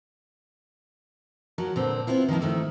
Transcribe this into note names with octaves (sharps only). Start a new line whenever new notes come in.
F3 F#3 F#4 A#4
A#2 D3 B3 C4
B3 C4 E4 F4
D#3 F3 A#3 E4
G#2 D#3 A3 E4